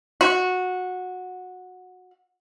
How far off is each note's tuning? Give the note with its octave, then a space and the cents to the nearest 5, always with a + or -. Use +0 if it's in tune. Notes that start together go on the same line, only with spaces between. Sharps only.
F#4 -15